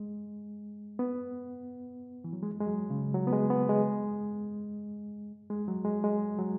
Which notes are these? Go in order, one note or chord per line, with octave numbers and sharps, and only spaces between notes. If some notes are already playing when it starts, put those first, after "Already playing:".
Already playing: G#3
B3
E3
F#3
G#3
G#3
F#3
C#3
F#3
B3
G#3
B3
G#3
G#3
F#3
G#3
G#3
F#3